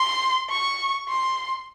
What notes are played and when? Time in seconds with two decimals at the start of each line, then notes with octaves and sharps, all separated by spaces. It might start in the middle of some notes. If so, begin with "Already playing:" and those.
Already playing: C6
0.50 C#6
1.09 C6